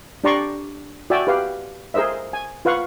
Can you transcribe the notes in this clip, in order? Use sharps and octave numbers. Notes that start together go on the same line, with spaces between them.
D4 G4 D5 A#5 C6 C#6
F#4 D5 E5 G5 G#5
G4 B4 F5
G#4 A#4 C5 D#5 E5
G#5
F4 B4 F5 F#5 C#6